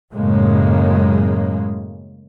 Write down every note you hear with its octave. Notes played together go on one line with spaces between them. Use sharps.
F#2 A2 C#3 G#3 A#3